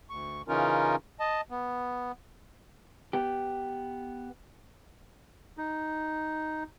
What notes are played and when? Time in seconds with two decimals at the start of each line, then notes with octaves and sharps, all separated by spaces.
0.10 D2 C#6
0.48 C#3 E3 C#4 D#4 F4 A#4
1.20 D#5 A5
1.50 B3
3.13 B3 G4
5.58 D#4